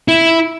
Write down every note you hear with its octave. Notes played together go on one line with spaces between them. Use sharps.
E4